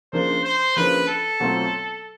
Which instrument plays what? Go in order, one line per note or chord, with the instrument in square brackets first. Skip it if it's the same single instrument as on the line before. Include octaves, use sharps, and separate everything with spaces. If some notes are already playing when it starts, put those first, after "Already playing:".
[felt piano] C#3 F3 A#3 D4 [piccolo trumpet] C5
[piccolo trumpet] C5
[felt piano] C#3 F3 A#3 D4 [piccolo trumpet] B4
[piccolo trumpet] A4
[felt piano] B2 F#3 A3 C4 F4